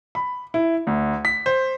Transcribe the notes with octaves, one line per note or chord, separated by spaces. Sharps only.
B5
E4
D2
B6
C5